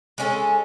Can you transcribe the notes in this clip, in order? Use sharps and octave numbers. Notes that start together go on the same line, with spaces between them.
G#3 C#4 E4 A4